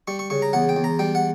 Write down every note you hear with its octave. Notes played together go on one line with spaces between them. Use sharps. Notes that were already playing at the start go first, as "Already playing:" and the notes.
G3 C#6
C#6
C#3 C#6
A#5
E2 F#5
G5
E2
A#5
G3 G5
F#5